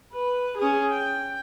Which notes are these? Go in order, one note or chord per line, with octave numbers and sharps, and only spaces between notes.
B4
C#4 G#4
G5